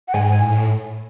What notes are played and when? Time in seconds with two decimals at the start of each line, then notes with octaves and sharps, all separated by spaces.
0.08 F#5
0.14 G#2 G#5
0.31 G#5
0.41 A2